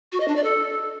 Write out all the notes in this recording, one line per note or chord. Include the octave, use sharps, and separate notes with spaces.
F#4
D#5
D4
D5
A4